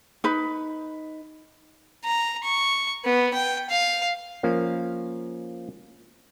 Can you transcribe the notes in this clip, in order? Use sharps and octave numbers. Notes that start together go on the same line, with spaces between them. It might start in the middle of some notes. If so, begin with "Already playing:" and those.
D#4 B4
A#5
C#6
B3
G5
F5
F3 A#3 C#4